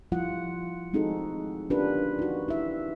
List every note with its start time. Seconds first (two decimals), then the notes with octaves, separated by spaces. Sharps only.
0.12 F3 G3 E4 F4 F#5
0.93 G#3 C4 D#4 F#4 G#4 A4
1.70 C#4 D4 F4 G4 A#4 B4
2.19 D#4 F#4
2.48 E4 E5